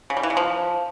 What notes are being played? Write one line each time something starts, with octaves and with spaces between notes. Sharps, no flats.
C#3
G3
E3
C#3
F3